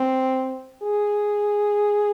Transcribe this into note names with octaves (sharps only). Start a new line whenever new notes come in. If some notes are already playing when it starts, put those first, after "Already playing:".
Already playing: C4
G#4